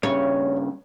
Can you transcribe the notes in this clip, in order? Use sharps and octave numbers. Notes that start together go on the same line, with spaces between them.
G2 C#3 C#5